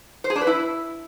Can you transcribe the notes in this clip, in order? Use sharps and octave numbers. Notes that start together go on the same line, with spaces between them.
C5
G#4
D4
B4
E4